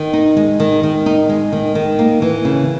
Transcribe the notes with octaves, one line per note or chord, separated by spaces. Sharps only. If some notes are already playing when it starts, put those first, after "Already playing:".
Already playing: D#3
D#4
G#3
D#3
D#3
D#4
G#3
D#3
D#3
A#3
E3
C#3